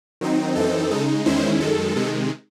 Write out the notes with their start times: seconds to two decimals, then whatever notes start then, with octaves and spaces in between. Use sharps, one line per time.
0.21 D#3 F#3 C4 D#4
0.55 F#2 E3 C4 D#4 A4
0.91 C#3 G#3 D#4
1.26 E2 D#3 G#3 C#4 E4 C5
1.60 F#2 D#3 G#3 A4
1.96 C3 D#3 G#3